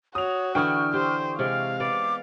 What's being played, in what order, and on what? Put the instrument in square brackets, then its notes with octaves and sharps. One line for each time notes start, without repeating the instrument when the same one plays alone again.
[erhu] F#4 [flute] C#5 [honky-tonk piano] D#6 F7
[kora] D3 E3 E4 [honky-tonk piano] G5 C#6 D#6 [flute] F6
[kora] G4 [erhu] C5
[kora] C3 G#3 D5 [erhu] F5 [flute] F6
[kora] B3 D5 [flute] D6